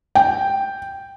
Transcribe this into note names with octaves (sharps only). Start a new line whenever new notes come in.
G5